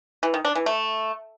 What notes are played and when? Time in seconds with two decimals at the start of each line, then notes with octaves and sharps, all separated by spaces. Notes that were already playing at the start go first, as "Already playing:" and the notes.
0.23 E3
0.34 D#3
0.45 D4
0.55 E3
0.66 A3